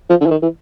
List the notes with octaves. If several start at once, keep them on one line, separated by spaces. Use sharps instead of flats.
F3
D3
E3
D#3
E3